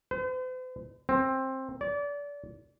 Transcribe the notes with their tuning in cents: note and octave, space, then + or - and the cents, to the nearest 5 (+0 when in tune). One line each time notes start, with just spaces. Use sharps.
C5 -45
C4 +15
D5 -30